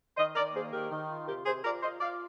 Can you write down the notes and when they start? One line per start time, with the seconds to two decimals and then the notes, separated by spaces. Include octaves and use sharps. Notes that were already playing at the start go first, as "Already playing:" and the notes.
0.17 D#3 C5 D#5
0.35 D#3 A#4 D5
0.54 A#3 G#4 C5
0.72 D#3 G4 A#4
0.91 D#3
1.09 F4
1.27 C3 G4 A#4
1.46 C3 G#4 C5
1.64 F4 A#4 D5
1.83 F4 C5 D#5
2.01 F4 D5 F5